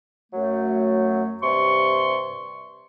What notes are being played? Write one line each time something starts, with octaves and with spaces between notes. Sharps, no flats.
F#2 F#3 A3
G2 C3 C6 C#6